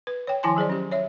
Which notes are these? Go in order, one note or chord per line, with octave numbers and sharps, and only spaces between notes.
B4
C#5 G5
D#3 F3 E4 G#5 A5 C6
F#3 G#4 C5 D5
C#4 G4
C#5 E5